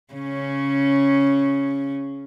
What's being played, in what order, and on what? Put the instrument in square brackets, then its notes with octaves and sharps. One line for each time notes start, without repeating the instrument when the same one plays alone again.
[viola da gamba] C#3 C#4